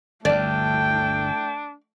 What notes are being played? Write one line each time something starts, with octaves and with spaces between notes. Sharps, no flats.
G1 D2 A3 D4 D5 G5